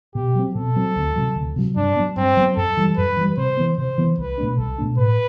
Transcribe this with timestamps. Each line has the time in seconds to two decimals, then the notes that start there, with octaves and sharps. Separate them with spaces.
0.15 B2 G4
0.35 F#3 C4
0.55 B2 A4
0.76 F#3 C4
0.96 D2
1.16 C3 F#3
1.36 D2
1.56 C3 F#3
1.76 G2 D4
1.96 F#3 B3
2.16 G2 C4
2.37 F#3 B3
2.57 F#2 A4
2.77 E3 G3
2.97 F#2 B4
3.17 E3 G3
3.37 C3 C5
3.57 E3 B3
3.77 C3 C5
3.98 E3 B3
4.18 C2 B4
4.38 B2 A3 D4
4.58 C2 A4
4.78 B2 A3 D4
4.98 A2 B4